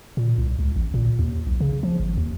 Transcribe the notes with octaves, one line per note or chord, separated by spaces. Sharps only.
A#2
C2
C#2
A1
A#2
D#2
B1
C#3
F3
G#1
D#2